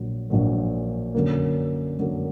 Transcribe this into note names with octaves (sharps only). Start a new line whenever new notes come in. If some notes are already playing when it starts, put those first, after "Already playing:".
Already playing: A#1 A#2 F#3
A#1 A#2 F#3
F#2 D3 F#3 A#3
F#2 D3 F#3 A#3